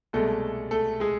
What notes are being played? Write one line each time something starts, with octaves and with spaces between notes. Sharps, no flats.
C2 B2 G#3 A3 A4
A3 A4
G#3 G#4